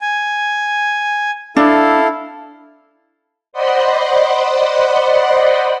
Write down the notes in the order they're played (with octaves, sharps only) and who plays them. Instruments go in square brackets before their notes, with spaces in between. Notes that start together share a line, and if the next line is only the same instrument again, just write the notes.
[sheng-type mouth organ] G#5
[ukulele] D4 [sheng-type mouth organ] E4 A4 F5
[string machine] C5 D5 D#5 F#5 B5 C6